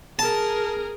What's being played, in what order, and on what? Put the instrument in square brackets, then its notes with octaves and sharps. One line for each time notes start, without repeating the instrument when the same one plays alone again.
[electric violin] G#4 A#4 [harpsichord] A5